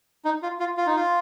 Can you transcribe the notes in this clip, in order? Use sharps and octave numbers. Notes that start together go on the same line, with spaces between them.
D#4
F4
F4
F4
D#4
F4